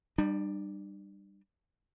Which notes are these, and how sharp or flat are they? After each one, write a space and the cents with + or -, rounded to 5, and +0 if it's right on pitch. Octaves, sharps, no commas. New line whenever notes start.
G3 +0 D4 +45